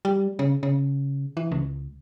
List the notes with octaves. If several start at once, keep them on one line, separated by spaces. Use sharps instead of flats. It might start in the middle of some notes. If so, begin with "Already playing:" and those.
G3
C#3
C#3
E3
C#2